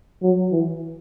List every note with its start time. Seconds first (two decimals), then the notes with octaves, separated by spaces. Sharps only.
0.23 F#3
0.52 E3